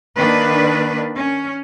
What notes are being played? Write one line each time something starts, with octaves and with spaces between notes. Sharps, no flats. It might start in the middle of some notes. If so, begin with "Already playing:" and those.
D#3 A#3 D4 B4
C#4